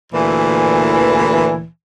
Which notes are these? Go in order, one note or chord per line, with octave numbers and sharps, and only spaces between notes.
D2 A#2 E3